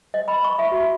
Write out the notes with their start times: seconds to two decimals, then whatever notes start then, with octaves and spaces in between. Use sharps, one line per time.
0.14 D#5
0.28 B5
0.44 C#6
0.59 E5
0.72 F#4